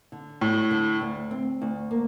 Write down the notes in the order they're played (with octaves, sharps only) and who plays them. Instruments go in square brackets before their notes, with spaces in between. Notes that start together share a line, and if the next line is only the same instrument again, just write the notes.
[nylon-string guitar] D3
[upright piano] A2 [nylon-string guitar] G3
[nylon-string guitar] D3
D2
C4
D2
A#3